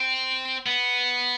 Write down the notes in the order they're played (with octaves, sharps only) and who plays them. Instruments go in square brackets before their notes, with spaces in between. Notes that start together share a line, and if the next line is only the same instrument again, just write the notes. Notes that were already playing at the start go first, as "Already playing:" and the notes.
Already playing: [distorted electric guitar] C4
B3